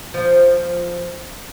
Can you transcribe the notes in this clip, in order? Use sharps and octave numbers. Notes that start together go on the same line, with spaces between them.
F3